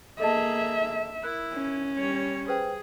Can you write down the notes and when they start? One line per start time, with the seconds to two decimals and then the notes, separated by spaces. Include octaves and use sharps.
0.20 A#3 G#4 A4 D#5 E5 A5
1.24 E4 A#4 F#6
1.53 C#4
1.98 G3 C#5
2.48 G#4 B4 C5 G5